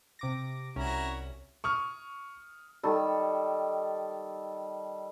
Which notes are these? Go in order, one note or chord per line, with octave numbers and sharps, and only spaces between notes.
C3 D6 A#6
C2 C#4 E4 F#4 A#5
C#6 D#6 F6
D#3 G3 A4